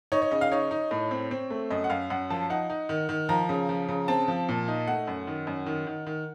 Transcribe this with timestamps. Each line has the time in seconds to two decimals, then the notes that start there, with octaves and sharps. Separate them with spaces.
0.12 D#4 C#5
0.22 C#5
0.31 C#3 D#5
0.41 F5
0.52 D#4 C#5
0.71 D#4
0.91 A2
1.11 C4
1.31 C4
1.50 A3
1.71 F#2 D#5
1.84 F#5
1.90 F#2 F5
2.10 F#2 F#5
2.30 F3 A5
2.50 D#4 F#5
2.70 D#4
2.89 D#3
3.09 D#3
3.29 F3 A#5
3.49 C#3
3.69 F3
3.88 C#3
4.08 C4 A5
4.28 F3
4.49 A#2
4.68 D#4
4.87 A3 F#5
5.08 F#2
5.27 D#3
5.47 F#2
5.66 D#3
5.87 D#3
6.07 D#3